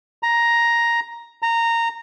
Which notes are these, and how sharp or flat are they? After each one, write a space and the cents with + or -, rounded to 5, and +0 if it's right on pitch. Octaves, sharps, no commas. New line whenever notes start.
A#5 +5
A#5 -15